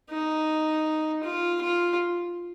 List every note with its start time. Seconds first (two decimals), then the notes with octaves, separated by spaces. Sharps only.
0.11 D#4
1.23 F4
1.61 F4